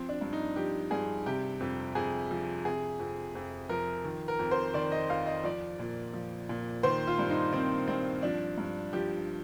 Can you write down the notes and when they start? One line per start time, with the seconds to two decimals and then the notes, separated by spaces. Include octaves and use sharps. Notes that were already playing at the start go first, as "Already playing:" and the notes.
Already playing: F3 C4
0.09 D4
0.21 G2
0.33 D#4
0.56 F3 G4
0.91 G2 G#4
1.26 C3 G4
1.60 F2
1.95 F2 G#4
2.31 F3
2.65 C3 G#4
2.99 F2
3.35 F2
3.69 F3 A#4
4.05 D#3
4.28 A#4
4.39 F2
4.51 C5
4.74 D#3 D5
4.92 D#5
5.09 F2 F5
5.27 D#5
5.43 F3 D5
5.79 A#2
6.13 F3
6.49 A#2
6.83 D#3 C5
7.07 F4
7.19 G2
7.29 D#4
7.53 D#3 C4
7.88 G2 C4
8.22 F3 D4
8.58 G2
8.93 F3 G4